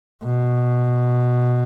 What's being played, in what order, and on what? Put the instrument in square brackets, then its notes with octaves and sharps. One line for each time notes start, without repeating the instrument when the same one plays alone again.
[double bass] B2